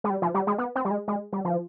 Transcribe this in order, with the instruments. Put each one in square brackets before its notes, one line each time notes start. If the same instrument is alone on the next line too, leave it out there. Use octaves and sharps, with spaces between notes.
[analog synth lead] G#3
G3
F3
G3
G#3
B3
C4
G3
G#3
G#3
G3
F3